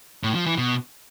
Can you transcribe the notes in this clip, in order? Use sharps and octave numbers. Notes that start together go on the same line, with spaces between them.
A2
F3
E3
B2